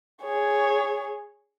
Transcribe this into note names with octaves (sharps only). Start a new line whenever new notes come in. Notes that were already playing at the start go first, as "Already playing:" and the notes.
G#4 C#5